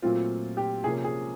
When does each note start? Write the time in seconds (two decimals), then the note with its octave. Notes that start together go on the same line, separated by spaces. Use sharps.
0.02 A#2 F#3 A3 C4 F4
0.57 G4
0.84 C3 F3 A#3 C#4 G#4
1.04 G#4